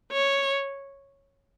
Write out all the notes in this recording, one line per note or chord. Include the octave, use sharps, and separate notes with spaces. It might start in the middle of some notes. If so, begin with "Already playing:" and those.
C#5